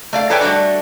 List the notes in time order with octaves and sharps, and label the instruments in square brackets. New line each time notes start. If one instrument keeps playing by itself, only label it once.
[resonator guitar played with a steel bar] A3 D5 F5
A4 B4 C#5 D5 G5 G#5
G3 A3 D4 F#4 D5